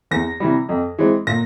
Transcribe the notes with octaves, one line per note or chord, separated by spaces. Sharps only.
E2 A#6
C3 E3 G3
F2
E3 G#3 C4
A#2 A#6